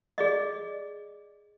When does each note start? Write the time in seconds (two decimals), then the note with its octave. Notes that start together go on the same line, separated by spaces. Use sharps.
0.18 G#4 D5 D#5